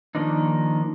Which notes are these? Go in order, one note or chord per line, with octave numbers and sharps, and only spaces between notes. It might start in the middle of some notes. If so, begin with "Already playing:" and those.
D#3 F3 A#3 D4 D#4